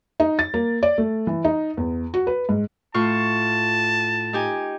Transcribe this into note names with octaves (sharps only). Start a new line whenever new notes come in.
D#4
A6
A#3
D5
A3
E3
D#4
E2
F#4
B4
G#2
A2 F4 A5 C#6
D#4 G4 G#5